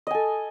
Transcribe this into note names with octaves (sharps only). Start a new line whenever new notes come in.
A4 D#5 G#5